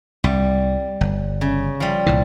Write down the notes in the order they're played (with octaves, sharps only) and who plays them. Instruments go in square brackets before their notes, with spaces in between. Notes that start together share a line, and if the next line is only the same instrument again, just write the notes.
[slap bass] C2 [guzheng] G3
[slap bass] G1
[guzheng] C#3
F3 G3
[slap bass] C2 A#2 E3